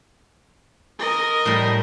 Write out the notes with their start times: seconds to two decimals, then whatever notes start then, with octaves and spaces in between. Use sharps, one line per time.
0.99 A#4 D#5
1.45 A2 G3